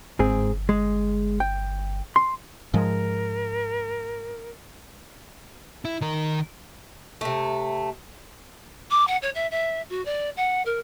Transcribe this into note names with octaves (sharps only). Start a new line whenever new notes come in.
G1 G#2 C4 G#4
G#3
G5
C6
G#2 F3 G#3 A#4
E4
D#3 A#4
C3 A3
D6
F#5
C#5
E5
E5
F#4
D5
F#5
A#4